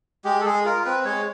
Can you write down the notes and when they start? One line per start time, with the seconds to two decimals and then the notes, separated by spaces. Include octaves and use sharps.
0.25 G#3 G4
0.41 A4
0.45 G#3 G#4
0.65 F4 A#4
0.85 C4 B4
1.05 G#3 C#5